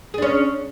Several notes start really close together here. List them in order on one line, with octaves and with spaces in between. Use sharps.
G#4 D4 C#4